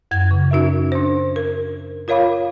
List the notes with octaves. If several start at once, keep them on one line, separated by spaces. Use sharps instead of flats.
F#2 G#6
C#3
C#4 D#4 F#4 A#4 E5
D4 C5
A#4
F4 A#4 C#5 F5 B5 D6